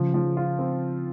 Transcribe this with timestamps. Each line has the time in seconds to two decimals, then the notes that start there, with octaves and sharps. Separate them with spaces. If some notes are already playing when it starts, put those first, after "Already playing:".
Already playing: C#3 F3
0.14 F3
0.37 F4
0.59 C4